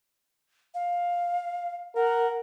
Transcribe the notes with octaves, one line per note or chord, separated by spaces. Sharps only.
F5
A#4 F#5